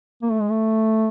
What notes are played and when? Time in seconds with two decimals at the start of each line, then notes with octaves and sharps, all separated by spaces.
0.22 A#3
0.32 A3
0.41 G#3
0.50 A3